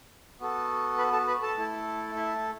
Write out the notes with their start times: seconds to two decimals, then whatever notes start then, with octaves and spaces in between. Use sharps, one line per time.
0.40 B3 F#4 A4
0.98 B4 B5
1.12 A4 A5
1.27 B4 B5
1.42 A4 A5
1.57 A3 E4 A4
2.15 E4 E5